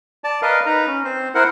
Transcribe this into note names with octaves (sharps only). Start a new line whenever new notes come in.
D5 A5
A#4 B4 D#5 F5
D#4 B4 A#5
C#4
C4 C5
E4 A#4 C5 F#5